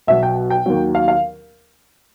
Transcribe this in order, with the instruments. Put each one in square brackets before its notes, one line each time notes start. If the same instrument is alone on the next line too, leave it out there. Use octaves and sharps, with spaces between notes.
[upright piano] B1 B2 F#3 E5
G5
G5
D#2 D#3 F#3
F5
F5